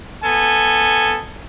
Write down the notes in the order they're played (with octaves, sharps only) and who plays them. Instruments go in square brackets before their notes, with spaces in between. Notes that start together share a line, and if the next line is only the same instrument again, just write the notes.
[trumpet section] B3 A4 G#5